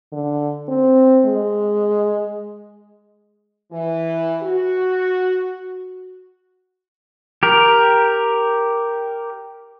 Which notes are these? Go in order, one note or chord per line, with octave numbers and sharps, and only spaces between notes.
D3
C4
G#3
E3
F#4
G4 A#4